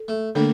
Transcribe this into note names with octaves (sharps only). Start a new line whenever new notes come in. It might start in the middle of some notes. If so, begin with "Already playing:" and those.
Already playing: A4
A3
D3 A3 A#3 D4 A4